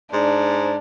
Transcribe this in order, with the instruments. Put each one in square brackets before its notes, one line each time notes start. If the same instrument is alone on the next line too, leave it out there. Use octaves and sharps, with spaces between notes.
[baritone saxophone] G#2 [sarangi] D4